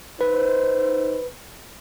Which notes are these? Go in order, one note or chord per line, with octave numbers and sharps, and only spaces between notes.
D#4 B4 C5